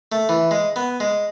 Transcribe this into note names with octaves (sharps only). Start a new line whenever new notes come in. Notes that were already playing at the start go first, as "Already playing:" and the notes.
A3
E3
G#3
B3
G#3